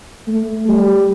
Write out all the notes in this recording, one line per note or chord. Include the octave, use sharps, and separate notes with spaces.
A3
G3